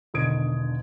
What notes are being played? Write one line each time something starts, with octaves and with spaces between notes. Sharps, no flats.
E1 D3 D#3 D#6 G#6 D7